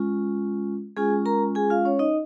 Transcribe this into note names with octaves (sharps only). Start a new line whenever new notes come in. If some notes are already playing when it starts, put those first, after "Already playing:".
Already playing: G#3 C#4 F4
G#3 C#4 F4 G#4 G#5
A#4 A#5
G#4 G#5
F4 F5
C#4 C#5
D#4 D#5